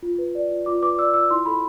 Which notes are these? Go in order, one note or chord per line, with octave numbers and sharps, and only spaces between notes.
F4
B4
D5
F4
F4 D6
B4 D6
D5 E6
F4 E6
E4 C6
A4 B5